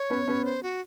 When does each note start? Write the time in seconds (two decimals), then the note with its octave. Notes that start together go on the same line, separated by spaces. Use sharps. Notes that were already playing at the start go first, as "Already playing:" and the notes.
Already playing: C#5
0.10 B3 C#4
0.28 B3 C#4
0.45 C5
0.63 F#4